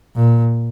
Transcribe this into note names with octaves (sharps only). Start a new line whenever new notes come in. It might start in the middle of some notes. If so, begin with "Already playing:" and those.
A#2